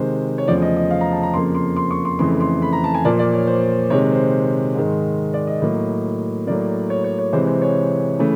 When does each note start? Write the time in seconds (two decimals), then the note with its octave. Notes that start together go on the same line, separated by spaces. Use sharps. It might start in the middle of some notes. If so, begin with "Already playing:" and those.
Already playing: C3 D#3 G#3 C5
0.38 C#5
0.48 E2 C#3 F3 A3 D5
0.62 D#5
0.76 D#5
0.91 F5
1.01 A#5
1.12 A5
1.23 A#5
1.34 F2 C#3 F3 A#3 C6
1.55 C6
1.77 C6
1.91 C#6
2.05 C6
2.19 F2 C#3 E3 A3 C6
2.41 C6
2.62 B5
2.73 A#5
2.84 A5
2.94 G#5
3.05 A#2 F3 A#3 D5
3.19 D5
3.34 C#5
3.47 C5
3.90 C3 D#3 G#3 C#5
4.12 C5
4.75 G#2 D#3 G#3
5.34 D5
5.47 D#5
5.62 A2 F#3 A#3
6.47 A2 F#3 A#3 D5
6.90 C#5
7.04 C#5
7.19 C#5
7.33 C3 E3 G#3 C5
7.47 C5
7.62 C#5
8.19 C#3 E3 A3